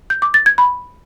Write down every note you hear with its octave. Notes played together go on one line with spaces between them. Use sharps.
G6
D6
A6
G#6
B5